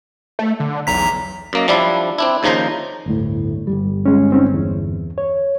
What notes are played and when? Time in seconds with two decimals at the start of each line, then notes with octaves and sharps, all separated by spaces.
0.39 A3
0.60 D3
0.87 B1 E2 A#5 B6
1.53 F#2 A#3 D#5
1.68 F3 G3 D4 E4
2.18 C4 D4 E4
2.43 D#2 C#3 F3 D#4 C5 A#5
3.06 G1 D2 A2
3.67 G1 D#2 G3
4.06 G#3 C#4
4.32 C4 C#4 D#4
4.54 E2
5.18 C#5